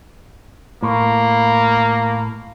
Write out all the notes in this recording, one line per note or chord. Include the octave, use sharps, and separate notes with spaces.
A2 A#3